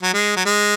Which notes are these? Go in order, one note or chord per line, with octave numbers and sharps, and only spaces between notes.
F#3
G#3
F#3
G#3